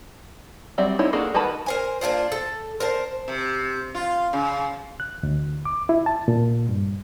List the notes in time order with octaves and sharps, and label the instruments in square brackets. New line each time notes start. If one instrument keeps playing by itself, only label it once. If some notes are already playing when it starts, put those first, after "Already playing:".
[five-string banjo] F#3 G3 C4 D5 E5
C4 D#4 E4 C#5
A#3 D4 F#4 G#4 A4
D#3 F#4 B4 A5 B5
[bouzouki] A#4 C5 G#5
A#3 D4 F4 C5
A4
A#4 C5 A5
[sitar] C3
F4
C#3
[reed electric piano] F#6
D2
D6
E4
A5
A#2
G2